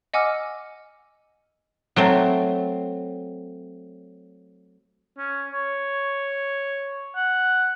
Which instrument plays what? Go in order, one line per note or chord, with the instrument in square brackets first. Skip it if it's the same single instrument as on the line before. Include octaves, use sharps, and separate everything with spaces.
[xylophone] D#5 F#5 G#5 D6 E6 F6
[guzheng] F#3 A3 C4
[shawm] C#4
C#5
F#5